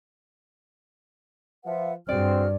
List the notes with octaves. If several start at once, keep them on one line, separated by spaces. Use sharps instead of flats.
F3 B4 E5 F#5
G2 C4 F#4 G#4 D5 F6